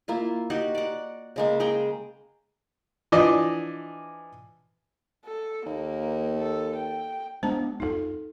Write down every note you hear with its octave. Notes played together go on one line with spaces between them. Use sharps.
A#3 E4 F4
D#4 F#4 G4 F#5
D5 F#5
C#3 G#3 A#3
G#3 G#4 G5 A#5
E3 F3 D4 D5 D#5
A4
D#2 A#3
A4
G5
G#3 B3 D4 C5 A5 A#5
D#1 F2 D#4 A4